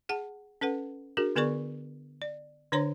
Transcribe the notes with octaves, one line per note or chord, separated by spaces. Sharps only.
G#4 F#5 A5
C#4 A4 B4 F#5
D4 F#4 G#4 A#4
D3 B3 G#4 A#4 D5 C#6
D5
D3 D4 C5 C#5 A#5 C6